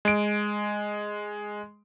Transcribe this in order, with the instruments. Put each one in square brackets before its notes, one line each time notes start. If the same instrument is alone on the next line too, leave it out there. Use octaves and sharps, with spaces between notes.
[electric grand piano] G#3 D7